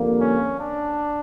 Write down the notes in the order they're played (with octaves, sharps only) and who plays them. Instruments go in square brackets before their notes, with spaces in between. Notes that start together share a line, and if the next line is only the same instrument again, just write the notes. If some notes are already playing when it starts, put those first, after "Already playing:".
Already playing: [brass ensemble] F2 D3 G3 A#3
[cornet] C#4
D4